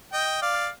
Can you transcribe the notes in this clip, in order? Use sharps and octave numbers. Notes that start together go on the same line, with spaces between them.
D#5 G5
D5 F5